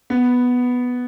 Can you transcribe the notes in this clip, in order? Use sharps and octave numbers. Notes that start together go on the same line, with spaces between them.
B3